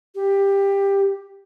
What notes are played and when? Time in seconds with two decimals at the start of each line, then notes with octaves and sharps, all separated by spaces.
0.15 G4